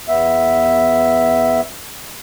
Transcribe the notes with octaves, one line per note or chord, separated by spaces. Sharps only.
E2 B3 E5